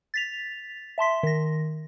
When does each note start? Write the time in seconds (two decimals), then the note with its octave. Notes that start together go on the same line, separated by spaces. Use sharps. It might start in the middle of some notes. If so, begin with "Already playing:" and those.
0.14 A6 B6 F7
0.98 E5 A5 C6 B6
1.23 D#3 A#6